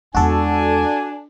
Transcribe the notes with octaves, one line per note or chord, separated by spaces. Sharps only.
E2 G#3 D4 F#4 A4 G#5